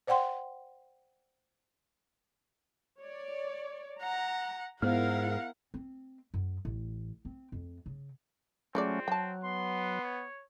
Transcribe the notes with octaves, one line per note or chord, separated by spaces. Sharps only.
C5 D5 F#5 G5 C6
C#5 D5
F#5 A#5
G#2 B3 E4 A#4 C5 F5 F#5
C4
F#2
A1
C4
F2
C#3
F3 F#3 G#3 A3 C4 C#4 D5
F#3 G5 A5
B3 C6
C#5